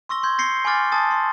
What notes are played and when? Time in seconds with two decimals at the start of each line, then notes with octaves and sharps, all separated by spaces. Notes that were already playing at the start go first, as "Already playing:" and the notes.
0.09 C6 C#6 E6 A#6 G7
0.23 C6 G6 G#6
0.38 G6 A#6 C7 C#7 G7
0.65 G#5 B5 C6 D6 F6 A6
0.92 G#5 A5 D#6 A6
1.11 C6